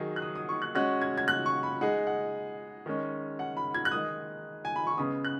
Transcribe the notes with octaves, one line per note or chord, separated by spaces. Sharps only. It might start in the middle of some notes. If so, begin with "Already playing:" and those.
Already playing: D#3 F#3 D#4 G#4
F#6
D#6
D#6
C#6
F#6
G#3 C#4 F#4 F#6
G#6
G#6
F#6
C#6
B5
G#3 D#4 G#4 F#5
F#5
D#3 G#3 C#4
F#5
B5
G#6
F#6
D#3 G#3 D#4 D#6
G#5
B5
C#6
C#3 G#3 B3 D#6
F#6